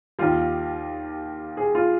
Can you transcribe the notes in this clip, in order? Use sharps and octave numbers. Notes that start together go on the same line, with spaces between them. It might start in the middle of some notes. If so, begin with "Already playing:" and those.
D#2 D#3 G3 F4
G#4
F4